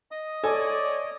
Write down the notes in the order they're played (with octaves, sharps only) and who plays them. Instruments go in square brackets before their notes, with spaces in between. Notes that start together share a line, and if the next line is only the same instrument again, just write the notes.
[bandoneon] D#5 D#6
[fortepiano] A4 G#5 [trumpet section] C#5 D5